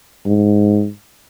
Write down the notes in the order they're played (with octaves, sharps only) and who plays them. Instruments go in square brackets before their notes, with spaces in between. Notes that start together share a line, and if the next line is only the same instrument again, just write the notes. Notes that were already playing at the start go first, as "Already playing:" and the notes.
[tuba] G#2